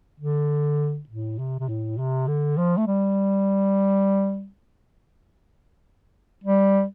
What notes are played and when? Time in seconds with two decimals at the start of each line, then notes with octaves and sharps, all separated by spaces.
0.20 D3
1.09 A2
1.39 C3
1.60 C3
1.68 A2
1.98 C3
2.27 D3
2.57 F3
2.77 A3
2.87 G3
6.44 G3